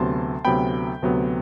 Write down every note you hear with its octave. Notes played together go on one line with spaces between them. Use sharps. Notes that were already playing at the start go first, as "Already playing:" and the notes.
Already playing: D2 C3 F#3 B3 A5 C6
D2 C3 F#3 B3 G5 B5
D2 C3 F#3 B3